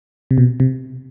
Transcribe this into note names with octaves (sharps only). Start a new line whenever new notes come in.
C3
B2
C3